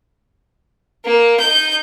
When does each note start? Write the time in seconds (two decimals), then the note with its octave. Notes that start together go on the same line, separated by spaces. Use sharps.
1.05 A#3
1.40 D#4 G6